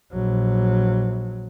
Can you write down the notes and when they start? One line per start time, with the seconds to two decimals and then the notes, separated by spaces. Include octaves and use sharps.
0.12 A#1 F#3